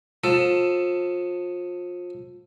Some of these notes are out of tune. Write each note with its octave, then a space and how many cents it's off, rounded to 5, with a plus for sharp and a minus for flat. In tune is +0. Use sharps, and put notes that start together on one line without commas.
F3 +30 A4 +10